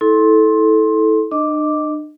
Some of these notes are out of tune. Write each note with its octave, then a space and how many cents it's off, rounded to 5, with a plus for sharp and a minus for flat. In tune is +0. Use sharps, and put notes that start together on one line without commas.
E4 -30 A4 -15 C6 +15
D4 +45 D#5 +0 D6 +0